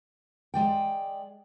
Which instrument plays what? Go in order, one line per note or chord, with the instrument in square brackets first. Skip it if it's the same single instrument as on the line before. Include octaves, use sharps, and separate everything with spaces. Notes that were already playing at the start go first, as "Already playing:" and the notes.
[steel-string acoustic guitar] G#3 D5 G5